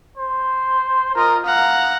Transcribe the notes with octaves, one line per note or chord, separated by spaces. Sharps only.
C5
F4 A#4 D#5
F5 F#5 A#5